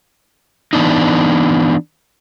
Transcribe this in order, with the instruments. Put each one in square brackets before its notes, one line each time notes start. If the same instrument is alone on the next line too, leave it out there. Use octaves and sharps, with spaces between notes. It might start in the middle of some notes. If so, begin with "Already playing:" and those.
[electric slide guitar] E3 B3 D4 D#4